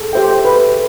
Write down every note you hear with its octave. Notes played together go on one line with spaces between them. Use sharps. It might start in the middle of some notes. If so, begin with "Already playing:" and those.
Already playing: G#4 A4
G4 C5 E5 G5
B4